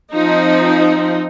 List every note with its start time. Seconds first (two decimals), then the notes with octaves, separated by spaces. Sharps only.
0.14 F3 C4 D#4